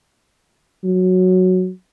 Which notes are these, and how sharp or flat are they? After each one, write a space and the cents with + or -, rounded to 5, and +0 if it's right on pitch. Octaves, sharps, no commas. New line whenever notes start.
F#3 -5